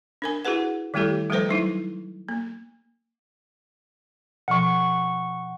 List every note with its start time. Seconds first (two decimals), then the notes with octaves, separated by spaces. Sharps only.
0.22 D4 A#4 G#5
0.45 E4 F#4 G#4 B4 F#5
0.94 D#3 G3 A3 E4 G4 A4
1.30 F3 G3 A3 A4 B4 C5
1.49 F#3 D#4 E4
2.29 A#3
4.48 B2 F3 F#5 C#6